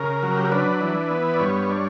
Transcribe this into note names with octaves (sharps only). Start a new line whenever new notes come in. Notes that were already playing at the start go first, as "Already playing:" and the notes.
Already playing: C#3 A#4
F#3
G4
A#4
D4 B4
E3
B3
D5
G2 C#5
D4